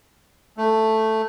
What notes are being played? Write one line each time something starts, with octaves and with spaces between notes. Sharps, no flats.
A3